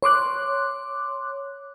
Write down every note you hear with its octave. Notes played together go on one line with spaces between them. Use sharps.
C#5 C6 D6 F#6